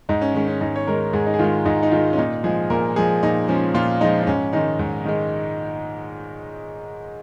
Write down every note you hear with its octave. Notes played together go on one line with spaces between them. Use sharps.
G#2 D#4
C#4
D#3 G#3 C#4
C#4
G#2 D#4
C#5
D#3 G#3 A#4
G#2 G#4
D#4
G#4
D#3 G#3 F4
G#2 D#4
D#4
D#3 G#3 F4
C#4
A#2 D#4
F3 G#3 G#4
A#2 A#4
F3 G#3 G#4
A#2 D#4
F3 G#3 C#4
A#2 F4
F3 G#3 D#4
D#4
G#2 C#4
D#3 G#3 D#4
G#2
D#3 G#3